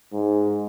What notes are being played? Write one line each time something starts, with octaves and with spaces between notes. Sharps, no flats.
G#2